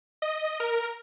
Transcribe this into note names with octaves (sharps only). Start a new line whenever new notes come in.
D#5
A#4